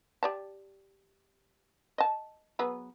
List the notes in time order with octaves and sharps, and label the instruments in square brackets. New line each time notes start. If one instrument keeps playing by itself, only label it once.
[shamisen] G4 D5 A5
D#5 A5
F#3 B3 G#4